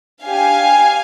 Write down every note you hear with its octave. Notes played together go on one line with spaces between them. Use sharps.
D4 G4 F5 G#5